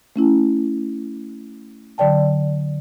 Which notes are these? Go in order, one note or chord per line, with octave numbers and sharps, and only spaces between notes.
A3 C#4 E4
D3 F#3 D5 G5 A5